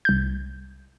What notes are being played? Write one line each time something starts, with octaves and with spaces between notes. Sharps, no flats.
C2 G6